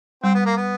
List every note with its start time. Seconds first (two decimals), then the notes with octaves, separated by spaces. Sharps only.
0.24 G3 C4
0.35 B3
0.45 A#3
0.57 B3